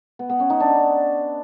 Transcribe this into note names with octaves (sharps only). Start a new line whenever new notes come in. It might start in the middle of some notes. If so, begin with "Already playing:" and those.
B3
B3
C#4
D#4
D4